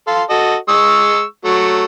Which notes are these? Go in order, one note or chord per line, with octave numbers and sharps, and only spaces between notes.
A4 F5 C6
F#4 A4 D#5
G#3 C#6 E6
F#3 A3 C#6